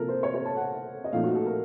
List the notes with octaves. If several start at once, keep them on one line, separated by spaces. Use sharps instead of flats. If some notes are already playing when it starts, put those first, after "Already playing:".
Already playing: C3 F3 A#3 F4 A4 A#4
C5
C#5
C#5
A5
F#5
D#5
A#2 F3 A3 D#4 F5
F#4
A4
A#4